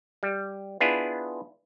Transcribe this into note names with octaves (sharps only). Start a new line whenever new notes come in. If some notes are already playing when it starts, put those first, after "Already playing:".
G3
B3 D4 E4 F4 G#4